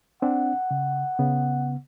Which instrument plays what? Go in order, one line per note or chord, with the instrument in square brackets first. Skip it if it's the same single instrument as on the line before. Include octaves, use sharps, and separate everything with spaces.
[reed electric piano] C4 D4 [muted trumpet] F#5
[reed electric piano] C#3
C#3 B3